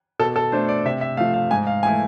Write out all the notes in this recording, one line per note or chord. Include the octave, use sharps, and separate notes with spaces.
B2 A4
A4
A3 D4 C5
D5
C3 E5
E5
F3 A3 F5
F5
G#2 G#5
F5
E3 A3 E4 G#5